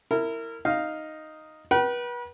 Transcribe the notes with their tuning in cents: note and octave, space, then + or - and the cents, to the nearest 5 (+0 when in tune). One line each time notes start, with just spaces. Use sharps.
E4 +0 A#4 -25
D#4 +0 F5 +0
B4 -35 G5 -45